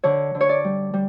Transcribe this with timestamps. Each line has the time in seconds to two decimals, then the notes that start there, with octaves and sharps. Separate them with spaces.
0.04 D3 C#5
0.35 D3
0.41 C#5
0.49 D5
0.64 G3
0.94 G3